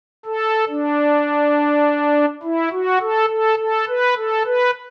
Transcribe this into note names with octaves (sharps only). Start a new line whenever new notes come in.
A4
D4
E4
F#4
A4
A4
A4
B4
A4
B4